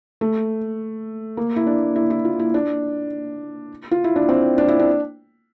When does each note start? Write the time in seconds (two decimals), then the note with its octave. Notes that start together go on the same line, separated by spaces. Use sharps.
0.21 A3
1.37 A#3
1.56 E4
1.67 D4
1.96 E4
2.10 E4
2.25 F4
2.39 E4
2.54 D4
3.91 F4
4.04 E4
4.16 D4
4.29 C4
4.58 D4
4.68 E4
4.79 D4